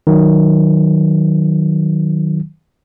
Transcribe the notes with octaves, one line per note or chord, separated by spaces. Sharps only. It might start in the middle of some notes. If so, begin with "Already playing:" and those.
D#3 F#3